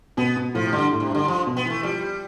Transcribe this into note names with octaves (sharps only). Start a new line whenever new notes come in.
B2 B3
B2
A2 F3
C3
G2 D3
A2
C3
G2
D3
F3
B2
B3
E3 A3
F3 G3